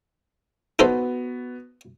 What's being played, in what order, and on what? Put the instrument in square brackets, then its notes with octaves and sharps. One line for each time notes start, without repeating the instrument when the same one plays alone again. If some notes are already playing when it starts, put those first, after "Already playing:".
[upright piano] B3 F#4 [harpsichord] D#4 A4 C5